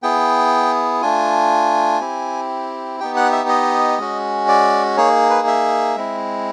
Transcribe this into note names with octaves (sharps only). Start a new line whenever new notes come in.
B3 E4 G#4 G5
A3 D4 F4 G#5
C4 E4 G4
B3 D#4 G4 G5
F#5
E5
D#5
G#3 C#4 F#4
D5
A#3 D#4 G#4 C#5
B4
E5
G#3 C4 E4